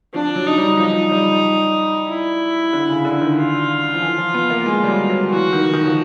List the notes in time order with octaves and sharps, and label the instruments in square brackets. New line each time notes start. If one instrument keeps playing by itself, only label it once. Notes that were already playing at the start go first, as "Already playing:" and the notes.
[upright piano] F3 [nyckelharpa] D4
[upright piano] F#3
[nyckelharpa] D#4
[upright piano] G3
[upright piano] F3 [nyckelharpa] D#4
[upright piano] G3
[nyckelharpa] E4
[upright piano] D3
C#3
D3
D#3
[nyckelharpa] F4
[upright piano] F3
E3
F3
B3
A#3
G#3
G3
F#3
F#3
[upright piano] E3 [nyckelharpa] F#4
[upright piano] D#3
D#3
F3